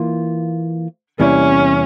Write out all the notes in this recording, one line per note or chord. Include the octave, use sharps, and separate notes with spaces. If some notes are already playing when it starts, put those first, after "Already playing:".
Already playing: E3 A#3 F4
E2 C3 G3 A#3 C#4 E4